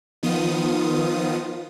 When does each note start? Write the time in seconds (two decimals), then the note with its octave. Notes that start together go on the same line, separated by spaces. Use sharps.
0.23 D#3 F3 B3 F4 D#6